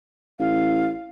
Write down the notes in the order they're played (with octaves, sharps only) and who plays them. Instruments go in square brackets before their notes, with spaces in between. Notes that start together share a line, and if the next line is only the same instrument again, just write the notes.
[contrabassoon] A1 [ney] F5